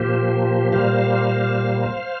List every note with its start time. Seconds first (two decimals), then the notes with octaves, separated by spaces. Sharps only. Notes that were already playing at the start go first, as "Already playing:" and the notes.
Already playing: A#2 F3 A#3 G4 C5
0.72 A#2 G3 A#3 C5 F5